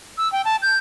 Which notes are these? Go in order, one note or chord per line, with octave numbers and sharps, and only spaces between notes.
E6
G5
A5
G6